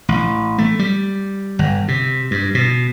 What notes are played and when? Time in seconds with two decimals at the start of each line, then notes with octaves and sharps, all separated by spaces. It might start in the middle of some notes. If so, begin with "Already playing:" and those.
0.08 A1
0.58 A3
0.79 G3
1.59 G1
1.88 C3
2.31 G2
2.55 B2